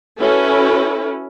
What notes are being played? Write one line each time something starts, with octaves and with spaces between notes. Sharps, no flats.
C#4 E4 F#4 A4 B4